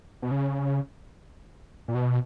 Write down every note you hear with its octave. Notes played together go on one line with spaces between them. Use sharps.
B2
C#3
A#2
B2